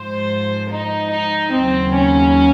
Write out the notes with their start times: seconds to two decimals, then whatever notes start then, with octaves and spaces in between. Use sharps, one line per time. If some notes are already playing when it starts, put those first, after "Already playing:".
Already playing: G#2 F3 C5
0.70 D#4
1.12 D#4
1.53 D#2 C#3 F#3 C4
1.95 C#4